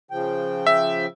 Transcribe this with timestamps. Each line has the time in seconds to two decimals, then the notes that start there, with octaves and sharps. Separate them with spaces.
0.11 C#3 F3 G5
0.67 E5